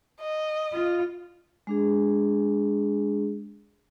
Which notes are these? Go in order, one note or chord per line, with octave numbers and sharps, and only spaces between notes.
D#5
F4
G#3 D4 G#4